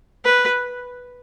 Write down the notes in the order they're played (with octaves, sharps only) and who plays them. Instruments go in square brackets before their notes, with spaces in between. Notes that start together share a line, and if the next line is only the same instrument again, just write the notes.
[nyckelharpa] B4